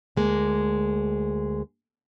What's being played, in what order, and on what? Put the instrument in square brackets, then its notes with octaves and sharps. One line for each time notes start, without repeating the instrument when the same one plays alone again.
[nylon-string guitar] D2 G#3 A#3